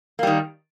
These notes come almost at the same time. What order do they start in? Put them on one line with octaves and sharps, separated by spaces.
A#3 G3 D#3